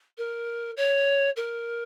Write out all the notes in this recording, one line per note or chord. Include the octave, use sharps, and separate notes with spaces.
A#4
C#5
A#4